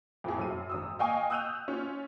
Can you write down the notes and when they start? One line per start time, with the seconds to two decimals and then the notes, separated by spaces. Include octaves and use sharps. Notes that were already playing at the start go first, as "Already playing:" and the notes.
0.24 F2 A2 G#4
0.38 F#2 D#7
0.70 G#1 D#6 E6
0.99 D#5 F5 G5 G#5 C#6 D#6
1.30 D#6 E6 F#6 G6 D#7 F7
1.68 C#4 F4